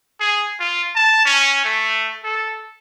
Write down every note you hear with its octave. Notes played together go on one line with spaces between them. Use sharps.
G#4
F4
A5
C#4
A3
A4